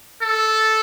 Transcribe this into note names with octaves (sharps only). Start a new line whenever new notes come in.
A4